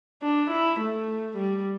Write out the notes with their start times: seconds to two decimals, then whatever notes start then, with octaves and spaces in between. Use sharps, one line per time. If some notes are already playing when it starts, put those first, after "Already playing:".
0.22 D4
0.51 E4
0.80 A3
1.37 G3